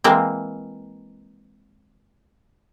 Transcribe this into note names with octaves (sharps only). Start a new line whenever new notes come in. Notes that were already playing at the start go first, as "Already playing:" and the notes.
E3 G#3 A#3 C4